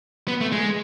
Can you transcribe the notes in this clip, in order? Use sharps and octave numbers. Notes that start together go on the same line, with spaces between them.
B3
A3
G#3